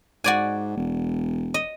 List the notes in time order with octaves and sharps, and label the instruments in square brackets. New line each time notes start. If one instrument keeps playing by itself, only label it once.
[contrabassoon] G#2 [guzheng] F#4 D5 G#5
[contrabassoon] E1
[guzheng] D#5